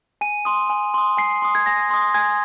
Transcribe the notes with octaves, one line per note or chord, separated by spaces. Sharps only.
G#5 D#7
C6 D#6
G#5
C6 D#6
G#5 C7
C6 D#6
G#6
G#5 A#6
C6 D#6
G#5 G#6